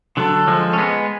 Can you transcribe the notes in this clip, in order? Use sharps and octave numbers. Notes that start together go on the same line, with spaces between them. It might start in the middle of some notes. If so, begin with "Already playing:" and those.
D3 F#3 A4
F3 G#3
C#4
G#3 B3